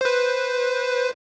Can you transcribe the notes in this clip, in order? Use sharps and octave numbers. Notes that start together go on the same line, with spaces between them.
B4 C5